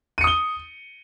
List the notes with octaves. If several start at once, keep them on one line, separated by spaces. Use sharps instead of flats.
D#6 C#7 D#7 G7